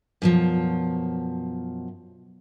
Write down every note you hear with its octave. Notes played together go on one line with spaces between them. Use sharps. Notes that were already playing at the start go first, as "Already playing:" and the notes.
F#2 B2 F3